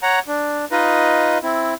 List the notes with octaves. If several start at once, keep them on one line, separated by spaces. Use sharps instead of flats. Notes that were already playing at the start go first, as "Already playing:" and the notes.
C#5 F#5 A#5
D4
D#4 F4 B4 D#5
C4 E4